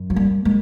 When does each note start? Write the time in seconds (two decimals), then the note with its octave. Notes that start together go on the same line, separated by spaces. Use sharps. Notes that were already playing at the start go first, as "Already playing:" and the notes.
Already playing: F#2
0.10 F#3
0.16 G3 A#3
0.45 G#3 A#3